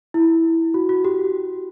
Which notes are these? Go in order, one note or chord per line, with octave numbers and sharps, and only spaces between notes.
E4
F#4
F#4
G4